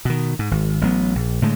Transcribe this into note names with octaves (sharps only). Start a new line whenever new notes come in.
B2 D#3
G#2
G#1
A1 F#3 B3
A#1
A2 D3 G#3